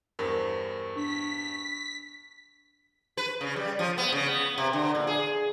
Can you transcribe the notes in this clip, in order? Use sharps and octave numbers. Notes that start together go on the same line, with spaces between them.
E2 G2 A#4 C5
D4 C#6 B6
B4
C#3
G3
F3
B3
C#3
B3
C3
D3
A#2
G#4